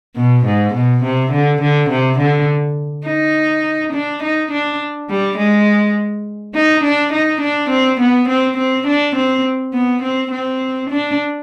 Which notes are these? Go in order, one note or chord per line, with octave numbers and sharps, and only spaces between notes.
B2
G#2
B2
C3
D3
D3
C3
D3
D#4
D4
D#4
D4
G3
G#3
D#4
D4
D#4
D4
C4
B3
C4
C4
D4
C4
B3
C4
C4
D4